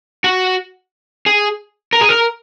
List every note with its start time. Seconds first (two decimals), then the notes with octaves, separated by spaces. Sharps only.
0.24 F#4
1.26 G#4
1.93 A#4
2.01 G#4
2.09 A#4